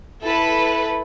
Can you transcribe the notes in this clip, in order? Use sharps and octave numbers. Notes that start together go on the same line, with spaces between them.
E4 A4 B4